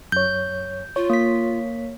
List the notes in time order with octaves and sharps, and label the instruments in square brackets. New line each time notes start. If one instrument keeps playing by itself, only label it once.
[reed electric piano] F#2 C#5 [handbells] G6
[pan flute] F4 [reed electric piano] C#5
[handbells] A#3 B6